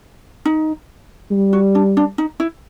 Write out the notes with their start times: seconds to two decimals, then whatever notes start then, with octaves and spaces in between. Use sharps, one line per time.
0.45 D#4
1.31 G3
1.53 F#4
1.75 D4
1.97 D4
2.18 D#4
2.40 E4